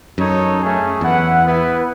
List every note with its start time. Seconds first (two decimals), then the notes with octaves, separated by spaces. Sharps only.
0.18 F#2 D#4 A4 C#5
0.61 A3 C#4 G#4
1.01 E2 E4 B4 F#5
1.44 B3 E4 B4